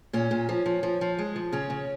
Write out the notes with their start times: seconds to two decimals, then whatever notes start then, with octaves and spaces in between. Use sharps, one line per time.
0.13 A#2 C#4
0.31 A#2
0.49 F3
0.66 F3
0.83 F3
1.01 F3
1.19 G#3
1.36 F3
1.52 C#3 C#4
1.70 C#3